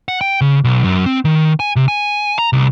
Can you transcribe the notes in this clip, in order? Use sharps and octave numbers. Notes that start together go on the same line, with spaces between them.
F#5
G5
C#3
B1
F#2
C4
D#3
G#5
C3
G#5
A#5
C2